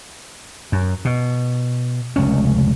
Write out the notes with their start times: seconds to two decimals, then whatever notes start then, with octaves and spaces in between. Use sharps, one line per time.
0.72 F#2
1.05 B2
2.16 F1 C#2 C#4